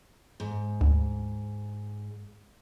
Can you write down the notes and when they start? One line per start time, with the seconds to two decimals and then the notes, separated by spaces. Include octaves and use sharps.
0.40 G#2
0.81 D2